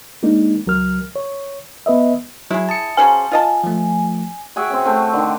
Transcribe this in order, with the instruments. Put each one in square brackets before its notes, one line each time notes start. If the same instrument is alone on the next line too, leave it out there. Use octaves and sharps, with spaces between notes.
[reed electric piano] G#3 A#3 D4 D#4
C#2 F#3 A#4 F6
C#5
B3 B4 D#5 E5
[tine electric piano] F#3 [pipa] E4 G#4
[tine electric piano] A5 D#6 C#7
[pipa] C#3 F#4 C5 [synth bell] G#5
[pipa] F4 D#5 A5
[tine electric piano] F3 A3
[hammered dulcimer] F#4 G#4 E5 G5
C4 C#4
A3 C4
D3 D#3